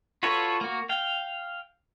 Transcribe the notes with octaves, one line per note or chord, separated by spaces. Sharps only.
F4 F#4 A4 B4 C#5
A#3 F#4
F5 G5